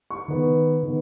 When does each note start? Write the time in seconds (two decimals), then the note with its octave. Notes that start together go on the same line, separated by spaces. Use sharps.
0.10 C#6
0.28 D#3 B3
0.83 D#3 B3